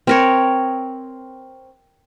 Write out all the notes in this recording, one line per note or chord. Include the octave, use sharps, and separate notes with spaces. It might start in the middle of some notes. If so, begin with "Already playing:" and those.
C4 A#4 C#5